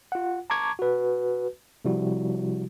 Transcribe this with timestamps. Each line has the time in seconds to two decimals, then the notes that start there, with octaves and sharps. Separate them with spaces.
0.12 F4 F#5
0.50 A5 A#5 C#6 D6 G#6
0.79 F#4 B4
1.85 C3 F3 G3 E4 F#4